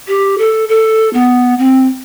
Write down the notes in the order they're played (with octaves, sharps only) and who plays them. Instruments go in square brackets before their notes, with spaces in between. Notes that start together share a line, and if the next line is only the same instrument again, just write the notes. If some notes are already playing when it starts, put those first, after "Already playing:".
[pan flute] G4
A4
A4
B3
C4